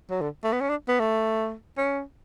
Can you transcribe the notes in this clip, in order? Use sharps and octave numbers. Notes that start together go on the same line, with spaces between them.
F#3
D3
A3
B3
C#4
D4
B3
A3
C#4